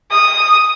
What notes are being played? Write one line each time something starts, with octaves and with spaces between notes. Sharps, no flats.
D#6